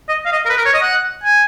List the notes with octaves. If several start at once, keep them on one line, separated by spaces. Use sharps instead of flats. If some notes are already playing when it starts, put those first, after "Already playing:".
D#5
F5
D#5
A#4
B4
A#4
C#5
D#5
F#5
G#5